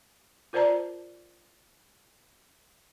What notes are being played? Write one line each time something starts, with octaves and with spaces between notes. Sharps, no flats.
F4 A#4 C5 D5 A5 A#5